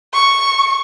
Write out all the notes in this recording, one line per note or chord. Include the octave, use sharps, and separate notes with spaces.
C#6